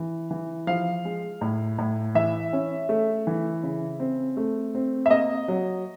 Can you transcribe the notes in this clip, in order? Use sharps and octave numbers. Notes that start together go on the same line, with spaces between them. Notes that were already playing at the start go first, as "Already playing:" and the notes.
Already playing: E3
E3
F3 F5
G#3
A2
A2
E3 E5
C#4
A3
E3
C#3
C4
A3
C4
E5
A#3 D#5
F#3